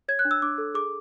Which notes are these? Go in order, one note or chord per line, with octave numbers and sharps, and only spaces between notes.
C#5 G#6
F#6
D4
E6
D4 D6
A4
G#4 D6